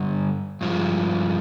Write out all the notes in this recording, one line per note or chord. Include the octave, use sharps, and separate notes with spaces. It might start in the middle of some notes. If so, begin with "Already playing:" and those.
Already playing: G2 D3 G3
G2 F3 G#3